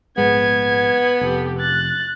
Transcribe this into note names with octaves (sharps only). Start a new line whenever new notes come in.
A#1 G#2 G#3 B3 G#6
F1 G4 A4
F#6 A6